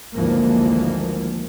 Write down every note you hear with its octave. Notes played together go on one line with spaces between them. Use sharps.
G#1 D2 E3 F3 A#3